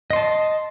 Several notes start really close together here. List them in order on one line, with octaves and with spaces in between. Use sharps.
D#5 C6 A5